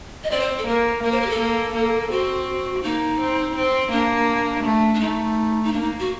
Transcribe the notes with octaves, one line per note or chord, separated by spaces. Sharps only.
D#5
C4 D5
C5
A4
A#3 A#4
A#3 A#4
C5
A#4
G4
A4
A#3
A#3
C4 F#4
A#3 D#4
C4
C4
A#3 D4
A3
D4
A3 D#4
D#4
A#3 D4
D#4
F#4